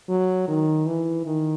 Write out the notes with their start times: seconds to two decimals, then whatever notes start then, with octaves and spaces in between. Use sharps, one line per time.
0.09 F#3
0.48 D#3
0.87 E3
1.26 D#3